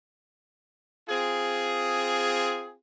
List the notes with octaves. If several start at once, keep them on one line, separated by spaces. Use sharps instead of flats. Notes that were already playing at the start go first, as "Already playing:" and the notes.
C4 F4 G#4